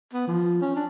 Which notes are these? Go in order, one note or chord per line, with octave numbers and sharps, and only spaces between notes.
B3
F3
C#4
D4